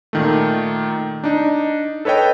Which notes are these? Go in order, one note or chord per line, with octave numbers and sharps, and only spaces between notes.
A#2 D#3 A3
D4 D#4
A4 B4 C#5 D#5 G5